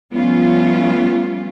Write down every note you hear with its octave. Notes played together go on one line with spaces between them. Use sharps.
F3 G3 A3 B3 C#4 F4